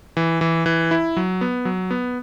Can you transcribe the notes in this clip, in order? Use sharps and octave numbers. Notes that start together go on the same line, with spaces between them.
E3
E3
E3
E4
F#3
B3
F#3
B3